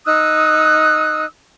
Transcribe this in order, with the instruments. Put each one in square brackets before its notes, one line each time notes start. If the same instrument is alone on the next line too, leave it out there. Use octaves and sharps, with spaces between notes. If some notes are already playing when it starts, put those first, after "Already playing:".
[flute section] D#4 D#6 E6 F#6